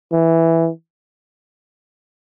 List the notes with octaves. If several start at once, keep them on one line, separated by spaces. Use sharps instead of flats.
E3